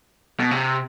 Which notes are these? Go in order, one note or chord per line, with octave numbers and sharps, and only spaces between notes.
B2
C3